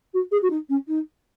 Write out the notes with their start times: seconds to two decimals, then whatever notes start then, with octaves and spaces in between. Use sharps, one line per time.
0.13 F#4
0.31 G#4
0.42 F#4
0.50 D#4
0.69 C#4
0.87 D#4